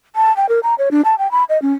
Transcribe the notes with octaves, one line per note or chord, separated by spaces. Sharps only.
A5
G5
A#4
A#5
C#5
D4
A5
G5
B5
D#5
C#4